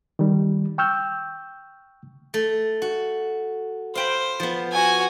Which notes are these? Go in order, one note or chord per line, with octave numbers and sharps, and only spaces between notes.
D#3 G3
G5 C#6 E6 F6 G6
A3
F#4
C5 F5 G5 B5
F3 B3
F#4 G#5